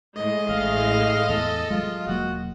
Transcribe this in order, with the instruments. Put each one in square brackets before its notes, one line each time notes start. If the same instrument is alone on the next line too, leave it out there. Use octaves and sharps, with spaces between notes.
[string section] A2 G#3 [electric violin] D#5
[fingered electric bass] A1 [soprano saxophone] F5
[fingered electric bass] E2 [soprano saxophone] A4
[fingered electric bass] F#3 G#3 [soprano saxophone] F4
[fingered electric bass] E1 F#3 A#3 [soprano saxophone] F#4